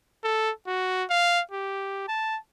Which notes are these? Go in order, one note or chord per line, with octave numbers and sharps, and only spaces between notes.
A4
F#4
F5
G4
A5